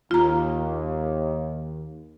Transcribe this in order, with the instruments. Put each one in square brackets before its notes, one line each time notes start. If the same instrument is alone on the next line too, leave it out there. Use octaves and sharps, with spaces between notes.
[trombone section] D#2 [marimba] F4 A#5